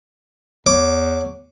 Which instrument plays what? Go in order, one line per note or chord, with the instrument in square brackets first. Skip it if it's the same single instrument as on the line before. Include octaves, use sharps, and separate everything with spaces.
[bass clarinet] E2 [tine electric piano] C#5 [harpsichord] D6